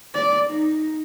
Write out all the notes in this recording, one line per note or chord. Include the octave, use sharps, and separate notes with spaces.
D5
D#4